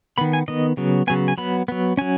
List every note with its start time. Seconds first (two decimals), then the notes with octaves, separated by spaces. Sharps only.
0.18 D#3 B3 B5
0.33 G#5
0.48 D#3 B3 D#5
0.77 C#3 F#3 B3
1.07 C#3 F#3 B3 G#5
1.28 G#5
1.38 F#3 B3 B5
1.68 F#3 B3
1.97 F#3 C#4 G#5